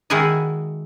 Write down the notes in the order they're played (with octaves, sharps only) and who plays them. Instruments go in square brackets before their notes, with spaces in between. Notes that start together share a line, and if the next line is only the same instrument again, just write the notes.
[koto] D#3 G#3 E4 F#4 G#4 D#5